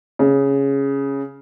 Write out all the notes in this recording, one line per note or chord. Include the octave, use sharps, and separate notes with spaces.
C#3